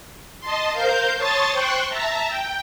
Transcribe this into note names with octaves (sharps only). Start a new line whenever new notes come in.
D#5 A5 C6
A#4 C5 F5 G6
C#5 A5 C6 C#6 D#6 A6
C5 G5 C6 C#6 F#6
E5 A5 A#5
G5